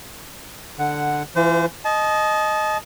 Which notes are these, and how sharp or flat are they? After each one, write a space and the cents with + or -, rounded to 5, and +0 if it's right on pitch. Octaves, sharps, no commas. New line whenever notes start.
D3 +5 F#5 +0
E3 +25 F4 +0 C5 -35
D#5 +0 A5 -35